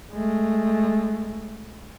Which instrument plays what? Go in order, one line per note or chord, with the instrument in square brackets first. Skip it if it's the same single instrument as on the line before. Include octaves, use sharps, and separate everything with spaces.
[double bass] G#3 A3